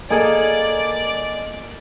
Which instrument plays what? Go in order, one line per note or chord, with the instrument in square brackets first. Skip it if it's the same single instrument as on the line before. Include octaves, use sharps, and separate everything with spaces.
[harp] A#3 G#4 A4 [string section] D5 [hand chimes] D#5 G#5